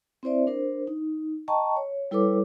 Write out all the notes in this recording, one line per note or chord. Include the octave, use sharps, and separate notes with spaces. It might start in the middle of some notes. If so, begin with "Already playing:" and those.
C4 E4 C5 D5 E5
D4 A#4 C5
D#4
D#5 G5 A5 A#5 C#6
C#5
G3 E4 A4 B4 C#5 D6